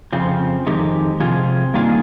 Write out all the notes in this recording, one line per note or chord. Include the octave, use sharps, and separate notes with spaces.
F2 C#3 F3 C4
F2 D#3 G#3 D#4 G4
C3 F3 C4 F4 G#4
G2 D#3 A#3 F4 G#4